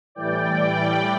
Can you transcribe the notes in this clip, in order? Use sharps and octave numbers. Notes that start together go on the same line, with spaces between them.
A2 E3 G3 D5 G5